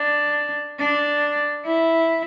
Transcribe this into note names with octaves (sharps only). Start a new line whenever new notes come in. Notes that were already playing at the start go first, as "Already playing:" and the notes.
Already playing: D4
D4
E4